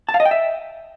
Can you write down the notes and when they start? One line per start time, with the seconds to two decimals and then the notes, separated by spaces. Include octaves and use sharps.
0.09 A5
0.14 F5
0.20 D#5
0.25 G5
0.31 E5